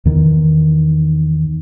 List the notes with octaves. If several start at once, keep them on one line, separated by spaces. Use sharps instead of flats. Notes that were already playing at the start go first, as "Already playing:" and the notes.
E2 D#3